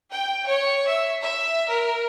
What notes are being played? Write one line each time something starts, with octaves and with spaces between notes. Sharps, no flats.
G5
C#5
E5
E5
A#4